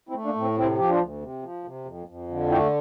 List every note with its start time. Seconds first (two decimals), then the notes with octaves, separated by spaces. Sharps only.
0.09 C4 E4
0.15 A3
0.25 A#3 D4
0.36 A2 C4
0.57 C3 C4 E4
0.78 F3 G4
0.89 D4 F4
1.00 D2
1.21 C3
1.43 F3
1.64 C3
1.85 F2
2.07 F2
2.28 D3
2.50 A3 E4 G4